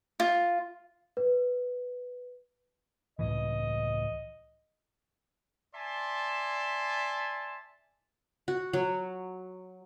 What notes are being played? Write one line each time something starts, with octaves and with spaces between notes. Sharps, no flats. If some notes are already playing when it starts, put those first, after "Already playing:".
F4
B4
C#2 A2 E3 D#5
D5 E5 G#5 A5 C6
F#4
F#3